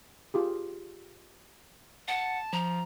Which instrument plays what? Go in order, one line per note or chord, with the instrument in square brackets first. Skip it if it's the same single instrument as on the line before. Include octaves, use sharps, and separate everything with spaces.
[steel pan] F4 G4 G#4
[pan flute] F#5 [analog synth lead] A5
[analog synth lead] F3 [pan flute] A#5